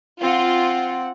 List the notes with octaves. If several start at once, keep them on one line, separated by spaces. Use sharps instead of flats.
C4 F4 F#5